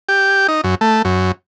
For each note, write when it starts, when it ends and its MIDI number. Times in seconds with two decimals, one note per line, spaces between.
0.09 0.47 67
0.48 0.61 63
0.64 0.75 42
0.81 1.02 57
1.05 1.32 42